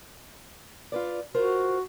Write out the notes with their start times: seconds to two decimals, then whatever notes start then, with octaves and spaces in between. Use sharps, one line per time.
0.92 F4 B4 D5
1.34 F4 F#4 A#4 C5